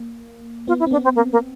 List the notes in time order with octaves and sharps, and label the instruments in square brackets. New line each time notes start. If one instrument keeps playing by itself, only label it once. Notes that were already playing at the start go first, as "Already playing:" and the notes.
Already playing: [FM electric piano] A#3
[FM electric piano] B3 [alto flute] F4
[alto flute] E4
[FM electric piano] C4
[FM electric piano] B3 [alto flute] D4
[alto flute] C4
A#3
A#3